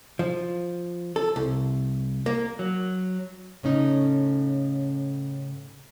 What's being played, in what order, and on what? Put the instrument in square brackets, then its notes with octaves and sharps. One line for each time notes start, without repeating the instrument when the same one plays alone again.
[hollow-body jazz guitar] F3
A4
C2
A#3
[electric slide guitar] F#3
[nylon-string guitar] A2 C#3 C#4 D#4